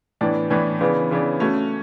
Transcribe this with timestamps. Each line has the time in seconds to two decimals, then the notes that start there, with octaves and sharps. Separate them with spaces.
0.21 A2 E3 B3 D4
0.50 A2 E3 B3 D4
0.81 C#3 E3 B3 D4
1.11 C#3 E3 B3 D4
1.40 A3 C#4 F#4